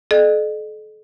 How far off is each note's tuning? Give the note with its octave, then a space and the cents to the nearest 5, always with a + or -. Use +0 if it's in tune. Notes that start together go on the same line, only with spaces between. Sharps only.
A4 -40 D#5 -45